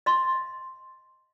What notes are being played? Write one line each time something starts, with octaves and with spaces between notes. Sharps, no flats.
D#5 F5 C6